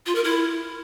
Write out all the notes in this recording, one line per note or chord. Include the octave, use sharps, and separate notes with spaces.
F4
A#4
E4